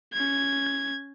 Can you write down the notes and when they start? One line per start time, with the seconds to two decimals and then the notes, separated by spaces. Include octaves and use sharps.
0.13 C#4 G#6